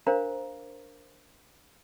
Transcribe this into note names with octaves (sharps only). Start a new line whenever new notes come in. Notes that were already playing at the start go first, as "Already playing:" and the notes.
D4 A#4 C5 F5 A#5